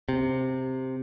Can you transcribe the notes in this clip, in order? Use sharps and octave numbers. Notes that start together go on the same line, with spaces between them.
C3